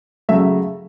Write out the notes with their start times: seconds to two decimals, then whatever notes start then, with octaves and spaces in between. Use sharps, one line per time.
0.29 C#3 F#3 A3 E5